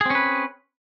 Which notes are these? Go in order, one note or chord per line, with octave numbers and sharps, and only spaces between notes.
C4 C#4 G#4 B4